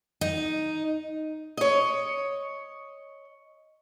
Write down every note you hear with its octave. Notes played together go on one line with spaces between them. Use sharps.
D#4
C#5 D#5